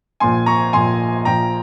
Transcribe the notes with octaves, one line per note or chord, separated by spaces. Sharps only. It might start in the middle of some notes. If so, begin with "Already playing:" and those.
A#1 A#2 F3 G#5 C6
A#5 C#6
A#1 A#2 F3 G#5 C6
A#1 A#2 F3 G5 A#5